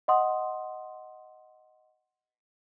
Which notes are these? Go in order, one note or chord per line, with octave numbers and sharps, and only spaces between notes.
D#5 F#5 C6 D#6